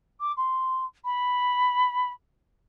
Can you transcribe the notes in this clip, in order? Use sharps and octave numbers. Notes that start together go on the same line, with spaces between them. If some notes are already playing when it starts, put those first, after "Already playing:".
D6
C6
B5